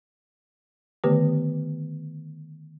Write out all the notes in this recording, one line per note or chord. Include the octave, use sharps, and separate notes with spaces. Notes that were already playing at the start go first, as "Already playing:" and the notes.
D3 D#3 A3 B3 G4 B4